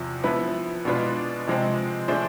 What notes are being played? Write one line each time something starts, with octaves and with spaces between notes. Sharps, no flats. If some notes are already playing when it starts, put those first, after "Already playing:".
Already playing: E2 C3 F3
F3 B3 E4 B4
B2 G#3 D4 F4 B4
C3 F3 G#3 C4
F3 A3 D4 G#4 C5